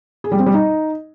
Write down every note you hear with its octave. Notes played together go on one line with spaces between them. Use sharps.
G#4
G3
C4
G3
D#4